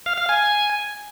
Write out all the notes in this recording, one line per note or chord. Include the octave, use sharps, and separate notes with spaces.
F5
F5
G#5